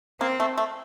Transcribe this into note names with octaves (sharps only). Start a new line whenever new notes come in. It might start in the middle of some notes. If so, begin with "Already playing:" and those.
A#3 C4
A3
A3